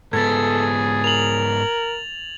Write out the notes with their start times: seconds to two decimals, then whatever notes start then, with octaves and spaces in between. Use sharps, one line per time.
0.13 G#2 B3 G#4 A4 G#6 A6
1.04 A#4 F7 F#7